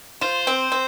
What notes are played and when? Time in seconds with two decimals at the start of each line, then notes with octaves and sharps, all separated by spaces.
0.21 F4 C5
0.47 C4
0.72 C4